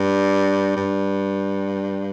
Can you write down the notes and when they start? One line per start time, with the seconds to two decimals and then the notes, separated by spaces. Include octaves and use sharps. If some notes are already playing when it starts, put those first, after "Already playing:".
Already playing: G2
0.77 G2